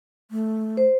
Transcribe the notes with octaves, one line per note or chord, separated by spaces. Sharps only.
A3
C5